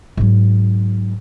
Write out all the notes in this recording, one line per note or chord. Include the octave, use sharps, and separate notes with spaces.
G#2 F#3